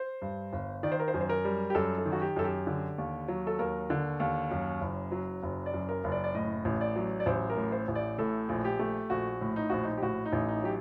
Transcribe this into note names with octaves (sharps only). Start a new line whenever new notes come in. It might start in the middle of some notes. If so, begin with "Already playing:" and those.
Already playing: C5
G2
G1
D#3 D5
C5
A#4
C5
F#2
C5
A#4
G3
G4
F#2 A4
A4
D#3
F#4
G4
F#2 A4
G4
D3
D#2
F#3
A4
D#2 A#4
D3
D#2
F#2
F#1
F#3
F#1
D5
F#2
A#4
F#1
D5
D5
A2 D#5
A1
D5
F#3
D5
A1 C5
A#4
A2
C5
A1
D5
A2 A4
A#1
G4
A3
A#1 F#4
A2
D#4
A#1 F#4
D#4
G4
A2 F#4
D#4
A1
D#4
F#3 G4